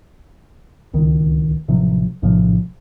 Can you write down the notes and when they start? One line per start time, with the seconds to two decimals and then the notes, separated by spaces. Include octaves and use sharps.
0.93 D1 C#2 D#3
1.68 A1 C3 F3 F#3
2.22 A#1 A2 C3 F3